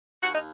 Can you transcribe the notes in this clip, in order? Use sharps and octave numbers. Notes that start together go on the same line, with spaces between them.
D#2 F#4
D#4